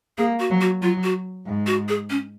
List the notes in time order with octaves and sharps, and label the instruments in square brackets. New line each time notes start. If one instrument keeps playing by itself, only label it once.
[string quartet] A#3 [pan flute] G#4
[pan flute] F#4
[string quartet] F#3
[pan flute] F#4
[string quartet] F#3 [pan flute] F4
[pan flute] F#4
[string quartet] G#2
[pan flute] F#4
G#4
C#4